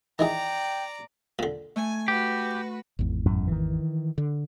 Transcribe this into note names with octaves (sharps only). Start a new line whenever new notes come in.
D#3 E3 G#4 D5 G5 A#5
A#2 D3
A3 G#5
F#4 G4 B4
G#1 E2
F#2 A2
D#3 E3
D3